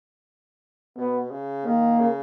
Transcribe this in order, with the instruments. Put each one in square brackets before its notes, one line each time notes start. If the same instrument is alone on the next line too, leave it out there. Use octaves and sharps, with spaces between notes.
[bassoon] B2 [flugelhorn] B3
[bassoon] C#3
[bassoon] D#3 [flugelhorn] A#3
[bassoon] C#3